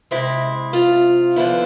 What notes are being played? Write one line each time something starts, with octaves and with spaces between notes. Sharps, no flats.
C3 G#3 C4 E4
F4
D3 F3 B3 E4